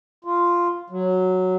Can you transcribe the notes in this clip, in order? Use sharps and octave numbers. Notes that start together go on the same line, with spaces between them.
F4
F#3